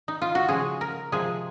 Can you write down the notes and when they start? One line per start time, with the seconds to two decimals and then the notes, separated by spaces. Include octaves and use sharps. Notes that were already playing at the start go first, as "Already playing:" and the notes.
0.08 D#4
0.22 F4
0.35 F#4
0.49 C#3 F3 G#3 G#4
0.81 A#4
1.12 C3 F3 G#3 G#4